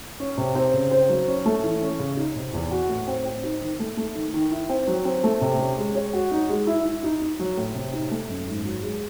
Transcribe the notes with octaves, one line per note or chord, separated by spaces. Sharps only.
C#4
C3
C4
C#3
C5
F#3
C#4
A3
E3
C#4
C#3
D#4
C3
E2
F#4
A2
C4
C4
D#4
D#3
A3
A3
D#3
D#3
E4
C4
F#3
C4
A3
C3
C#4
G#3
C#5
F#4
D#4
G#3
E4
E4
D#4
D#4
F#3
A2
C3
D#4
A3
F#2
G#2
F#3
G#3